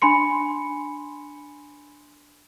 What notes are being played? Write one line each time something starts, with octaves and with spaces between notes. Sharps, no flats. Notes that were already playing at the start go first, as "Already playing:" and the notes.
D4 G#5 B5 C6 C#7